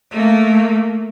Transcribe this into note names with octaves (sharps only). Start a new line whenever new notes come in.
A3 A#3